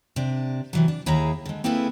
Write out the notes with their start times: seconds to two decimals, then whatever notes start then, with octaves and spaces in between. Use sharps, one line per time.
0.16 C3 D4
0.73 C3 E3 F#3
0.88 D4
1.06 D#2 E4 G#4 E5 F5 A#5
1.45 D3 G#3
1.64 A#3 C4 E4 G#4 A4 B4